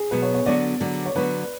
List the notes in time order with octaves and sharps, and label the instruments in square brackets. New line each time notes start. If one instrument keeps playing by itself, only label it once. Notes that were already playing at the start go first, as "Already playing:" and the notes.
Already playing: [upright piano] G#4
[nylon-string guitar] B2 F#3 B3 [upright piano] B4
[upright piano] C#5
C#5
[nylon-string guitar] D3 F#3 B3 F#4 [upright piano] D5
[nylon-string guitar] D3 F#3 B3 F#4
[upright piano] C#5
[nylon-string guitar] D3 F#3 B3 F#4 [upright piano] B4